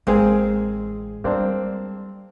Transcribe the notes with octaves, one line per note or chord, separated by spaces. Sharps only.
A1 G#3 A#3 C4 G#4
G3 A#3 C4 D4